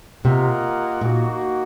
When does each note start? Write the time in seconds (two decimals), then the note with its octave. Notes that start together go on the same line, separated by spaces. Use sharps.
0.25 C3 A#3 F4 A#4 D#5 F#5
1.01 A#2 A#3 D#4 F#4